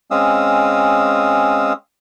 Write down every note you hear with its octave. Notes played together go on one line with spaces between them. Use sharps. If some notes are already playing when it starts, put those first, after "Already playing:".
G#3 C4 C#4 F5 D#6 E6